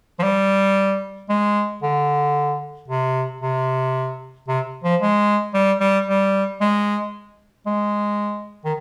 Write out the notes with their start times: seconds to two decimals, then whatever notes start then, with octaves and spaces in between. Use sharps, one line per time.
0.19 F3
0.23 G3
1.29 G#3
1.82 D3
2.88 C3
3.41 C3
4.48 C3
4.84 F3
5.01 G#3
5.54 G3
5.80 G3
6.07 G3
6.61 G#3
7.66 G#3
8.65 D#3